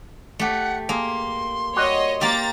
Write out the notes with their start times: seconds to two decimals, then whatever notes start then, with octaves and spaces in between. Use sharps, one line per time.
0.39 A3 G4 F#5
0.89 A#3 G#4 C6
1.76 G3 F#4 C#5 D#5 F#5
2.21 A#3 G4 A#5 A6